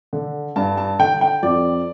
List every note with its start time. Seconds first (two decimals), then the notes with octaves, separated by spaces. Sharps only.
0.13 D3
0.56 G2 A5
0.77 A5
0.99 D3 G5
1.21 G5
1.43 F2 D5